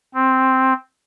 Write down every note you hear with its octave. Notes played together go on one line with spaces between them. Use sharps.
C4